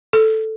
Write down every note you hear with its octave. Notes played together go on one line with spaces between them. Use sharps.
A4